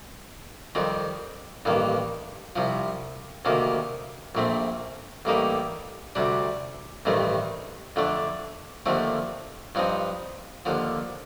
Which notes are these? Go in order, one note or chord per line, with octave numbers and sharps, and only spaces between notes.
F2 D#3 G3 C4
A1 G2 D#3 A#3
C2 C3 F3
D2 C3 D#3 A#3
A#1 A#2 A3 C4
A1 A2 G3 A#3 D#4
D2 C3 G3 D4
A1 G2 D#3 A3 C4
F2 D3 A3 D4
D#2 D3 F3 A3 C4
G2 F3 C4 D#4
D#2 D3 F3